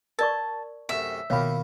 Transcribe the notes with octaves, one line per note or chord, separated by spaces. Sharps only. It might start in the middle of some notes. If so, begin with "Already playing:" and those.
A#4 D5 A5 C#6
F#2 C3 A3 E5
B2 D#3 A#3 F4 C#5 F5 B5